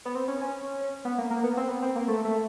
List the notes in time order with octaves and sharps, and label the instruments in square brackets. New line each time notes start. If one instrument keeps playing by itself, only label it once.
[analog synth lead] B3
C4
C#4
C#4
B3
A#3
A#3
B3
C4
B3
C4
A#3
A3
A3